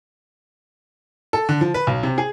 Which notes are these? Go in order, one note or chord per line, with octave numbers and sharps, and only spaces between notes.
A4
D3
F3
B4
B1
C3
G#4